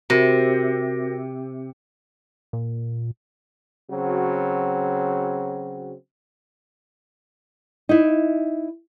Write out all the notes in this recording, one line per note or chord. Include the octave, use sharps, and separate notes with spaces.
C3 F#4 A#4 A#6
A#2
C#3 F#3 C4 F#4
D#4 E4